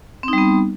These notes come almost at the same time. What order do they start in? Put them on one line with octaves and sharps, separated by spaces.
C4 D#4 G3 B3